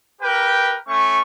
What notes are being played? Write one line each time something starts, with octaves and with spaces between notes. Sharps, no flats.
G4 A#4 B4 G5
A3 C#4 C#6